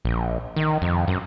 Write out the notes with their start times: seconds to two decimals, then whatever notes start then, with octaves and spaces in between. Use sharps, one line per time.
0.05 A#1
0.56 D#3
0.82 F2
1.08 F#2